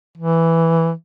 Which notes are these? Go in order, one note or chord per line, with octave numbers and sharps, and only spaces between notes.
E3